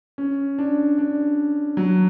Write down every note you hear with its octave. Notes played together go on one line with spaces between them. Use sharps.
C#4
D4
D4
F#3